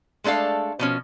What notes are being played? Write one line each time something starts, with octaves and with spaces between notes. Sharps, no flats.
G#3 A3 D4 A4 F5
B2 F3 C#4